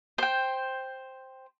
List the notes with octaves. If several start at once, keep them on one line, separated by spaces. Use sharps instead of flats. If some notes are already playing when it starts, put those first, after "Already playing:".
C5 G5